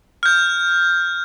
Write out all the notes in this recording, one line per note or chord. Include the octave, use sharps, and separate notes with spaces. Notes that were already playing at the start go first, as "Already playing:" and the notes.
F6 G6